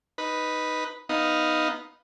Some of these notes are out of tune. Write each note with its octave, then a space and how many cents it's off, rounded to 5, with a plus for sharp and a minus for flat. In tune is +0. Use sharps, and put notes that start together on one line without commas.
D#4 +0 B4 +0
B3 +0 D#4 +0 F5 +0